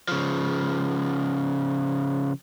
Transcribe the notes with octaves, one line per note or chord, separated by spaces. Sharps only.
C#3 F3